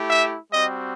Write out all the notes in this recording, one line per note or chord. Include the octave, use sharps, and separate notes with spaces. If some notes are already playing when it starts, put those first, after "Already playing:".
Already playing: A3 E4 G4
E5
G3 C4 F#4 D#5